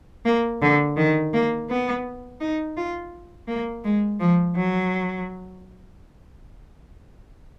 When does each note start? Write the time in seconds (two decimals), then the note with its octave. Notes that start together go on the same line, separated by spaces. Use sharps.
0.25 A#3
0.62 D3
0.97 D#3
1.33 A#3
1.69 B3
2.40 D#4
2.77 F4
3.48 A#3
3.84 G#3
4.20 F3
4.56 F#3